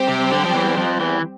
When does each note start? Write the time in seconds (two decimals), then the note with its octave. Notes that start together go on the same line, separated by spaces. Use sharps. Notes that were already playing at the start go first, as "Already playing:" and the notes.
Already playing: G3 C4 G4 C5
0.08 C3
0.32 D3
0.45 F3
0.55 E2 E3
0.77 F2 F3
1.00 E2 E3